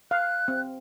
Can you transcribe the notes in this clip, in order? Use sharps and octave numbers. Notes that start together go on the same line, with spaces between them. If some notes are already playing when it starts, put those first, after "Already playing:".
F5 F#6
C4